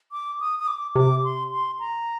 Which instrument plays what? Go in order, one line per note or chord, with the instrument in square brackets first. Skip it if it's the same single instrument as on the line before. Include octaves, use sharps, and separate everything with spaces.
[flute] D6
D#6
D#6
D6
[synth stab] C3 [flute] D6
[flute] C6
C6
A#5